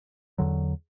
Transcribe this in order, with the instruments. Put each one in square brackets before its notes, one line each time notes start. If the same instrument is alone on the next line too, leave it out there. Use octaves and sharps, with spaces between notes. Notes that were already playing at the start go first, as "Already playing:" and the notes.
[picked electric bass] E2 D3 F#3